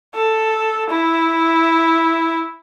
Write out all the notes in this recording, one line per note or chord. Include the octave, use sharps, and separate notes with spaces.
A4
E4